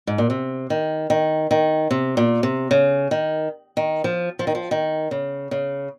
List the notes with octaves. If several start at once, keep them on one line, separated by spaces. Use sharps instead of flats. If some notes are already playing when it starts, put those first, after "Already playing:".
G#2
A#2
C3
D#3
D#3
D#3
C3
A#2
C3
C#3
D#3
D#3
F3
F3
D#3
F3
D#3
C#3
C#3